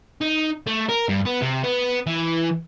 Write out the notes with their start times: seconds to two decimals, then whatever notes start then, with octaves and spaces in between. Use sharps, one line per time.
0.21 D#4
0.67 A3
0.89 A#4
1.09 G2
1.25 B3
1.42 C3
1.63 B3
2.07 E3